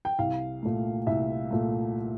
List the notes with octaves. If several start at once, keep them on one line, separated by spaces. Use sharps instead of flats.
G5
C2 F5
A#2 A3
C2 E5
A#2 A3